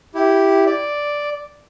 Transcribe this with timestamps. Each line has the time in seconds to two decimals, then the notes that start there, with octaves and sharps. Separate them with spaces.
0.15 E4 G4
0.66 D5